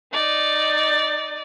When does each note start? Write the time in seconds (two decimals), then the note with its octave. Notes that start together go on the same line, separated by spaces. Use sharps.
0.13 D#4 D5